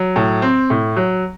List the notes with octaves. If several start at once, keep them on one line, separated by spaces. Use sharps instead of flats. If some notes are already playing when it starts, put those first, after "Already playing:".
Already playing: F#3
A2
C4
A2
F#3